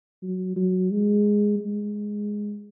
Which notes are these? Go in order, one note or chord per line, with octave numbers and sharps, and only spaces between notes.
F#3
F#3
G#3
G#3